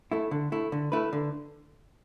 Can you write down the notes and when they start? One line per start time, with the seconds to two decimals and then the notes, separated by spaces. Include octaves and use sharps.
0.12 A3 E4
0.31 D3
0.52 A3 E4
0.72 D3
0.92 A3 E4 B4
1.13 D3